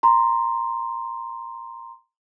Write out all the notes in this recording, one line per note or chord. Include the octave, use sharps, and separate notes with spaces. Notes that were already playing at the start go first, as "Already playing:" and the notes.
A#5 C6